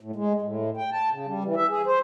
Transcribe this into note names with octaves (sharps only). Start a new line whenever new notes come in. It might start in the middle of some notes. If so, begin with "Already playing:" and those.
A2
G#3
A2
G5
A5
C#3
G3
E3
E5
G#4
C5